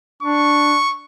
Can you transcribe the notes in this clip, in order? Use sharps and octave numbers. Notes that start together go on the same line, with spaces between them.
D4 C#6